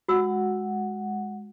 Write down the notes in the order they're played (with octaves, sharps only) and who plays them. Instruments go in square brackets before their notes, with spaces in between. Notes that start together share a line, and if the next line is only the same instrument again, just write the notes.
[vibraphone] G#3 F#5 [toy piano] F#4 E6